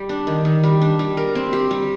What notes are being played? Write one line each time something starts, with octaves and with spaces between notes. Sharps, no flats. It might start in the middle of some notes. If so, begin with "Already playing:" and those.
Already playing: G3
D4
D#3
D#3
G3
D4
G3
A#4
C4
G4
G3